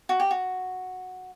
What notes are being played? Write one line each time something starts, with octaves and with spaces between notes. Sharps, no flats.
F#4
G4
F#4